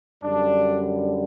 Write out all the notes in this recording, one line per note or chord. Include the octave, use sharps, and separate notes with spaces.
F#2 D3 G3 D4